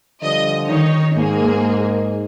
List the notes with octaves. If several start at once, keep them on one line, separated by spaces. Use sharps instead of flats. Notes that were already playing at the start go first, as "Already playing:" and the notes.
D3 F3 G3 D#5
D#3 D#4 C#5
G#2 A#3 G#4